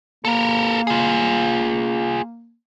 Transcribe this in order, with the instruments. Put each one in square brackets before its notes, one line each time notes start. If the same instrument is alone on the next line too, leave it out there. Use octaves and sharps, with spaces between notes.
[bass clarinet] A#3 [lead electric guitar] A4 A#4
[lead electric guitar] F4 G#4